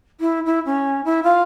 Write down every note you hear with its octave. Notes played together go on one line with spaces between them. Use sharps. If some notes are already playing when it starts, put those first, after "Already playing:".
E4
E4
C#4
E4
F4